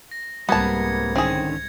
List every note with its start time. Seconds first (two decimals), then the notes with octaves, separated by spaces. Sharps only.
0.11 A#6
0.49 C2 G#2 G3 A#3 B3 A5 G#6 C#7
1.15 D3 D#3 C4 C#4 G#4 G#6 A#6